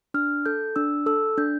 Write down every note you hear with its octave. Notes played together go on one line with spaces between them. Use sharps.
D4 F6
A4 G6
D4 E6
A4 E6
D4 G6